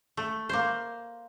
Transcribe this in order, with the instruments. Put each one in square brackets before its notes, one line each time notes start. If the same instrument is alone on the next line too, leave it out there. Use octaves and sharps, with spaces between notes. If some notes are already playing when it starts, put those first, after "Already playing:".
[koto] A3
A#3 C5